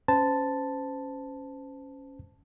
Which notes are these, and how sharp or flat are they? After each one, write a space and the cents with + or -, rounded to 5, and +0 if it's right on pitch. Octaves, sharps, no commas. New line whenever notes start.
C#4 +0 C5 -30 A5 +0